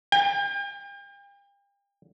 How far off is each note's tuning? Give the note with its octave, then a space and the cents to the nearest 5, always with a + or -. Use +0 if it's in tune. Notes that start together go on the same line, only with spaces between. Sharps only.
G5 +40